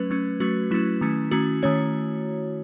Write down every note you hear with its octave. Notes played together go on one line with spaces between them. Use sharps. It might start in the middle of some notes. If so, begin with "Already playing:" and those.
Already playing: F#3 A3 C#4 B4
F#3 A3 C#4
F#3 A3 C#4 F#4
F#3 A3 C#4 E4
D#3 A3 C#4
D#3 A3 C#4 F#4
D#3 A3 C#4 C#5